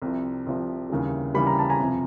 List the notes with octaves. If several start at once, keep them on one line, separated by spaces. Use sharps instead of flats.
C2 C3 F3
C2 C3 F3
D#2 C#3 E3 G3
D#2 C#3 E3 G3 B5
A#5
A5
G#5 A#5
F2 C3 F3